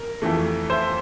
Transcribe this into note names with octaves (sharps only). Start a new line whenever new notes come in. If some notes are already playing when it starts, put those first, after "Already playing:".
Already playing: A#4
F2 E3 A3
C5 E5